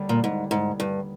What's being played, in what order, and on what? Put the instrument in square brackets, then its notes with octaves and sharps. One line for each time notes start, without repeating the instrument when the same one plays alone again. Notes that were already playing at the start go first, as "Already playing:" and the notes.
Already playing: [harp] D#2 D3 G3
[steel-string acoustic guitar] A#2
G#2
G#2
G2